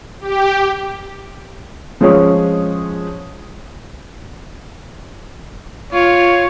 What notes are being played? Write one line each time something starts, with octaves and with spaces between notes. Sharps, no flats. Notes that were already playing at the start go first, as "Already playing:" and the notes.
G4
F3 G#3 C#4 G#4 C#5
F4 C#5